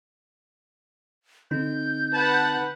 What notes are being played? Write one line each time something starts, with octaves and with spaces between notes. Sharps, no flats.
D3 C4 D#4 G6
B4 F#5 A5